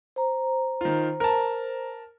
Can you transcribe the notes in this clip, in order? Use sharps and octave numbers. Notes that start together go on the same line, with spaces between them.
C5 A#5
D#3 F4
A#4 A5